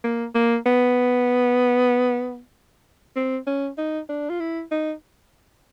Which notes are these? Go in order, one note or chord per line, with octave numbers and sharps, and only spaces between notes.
A#3
A#3
B3
C4
C#4
D#4
D4
F4
E4
D#4